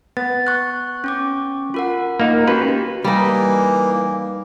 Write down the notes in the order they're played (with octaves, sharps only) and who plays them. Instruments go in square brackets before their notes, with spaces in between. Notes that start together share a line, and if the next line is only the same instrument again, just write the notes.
[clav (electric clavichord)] B3 [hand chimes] A6
[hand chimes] C#6 F#6
C#4 C#6 D6
F4 A#4 F#5
[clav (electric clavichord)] A#3 D#4
[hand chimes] C#4 F#4 G4 [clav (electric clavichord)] B4
[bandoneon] E3 A#3 [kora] G3 D#4